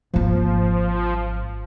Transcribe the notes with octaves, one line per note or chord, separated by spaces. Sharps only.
G#1 F3 A#3